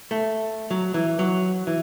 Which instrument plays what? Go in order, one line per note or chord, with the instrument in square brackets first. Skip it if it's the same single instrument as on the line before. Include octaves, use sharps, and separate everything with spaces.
[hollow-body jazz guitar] A3
F#3
E3
F#3
E3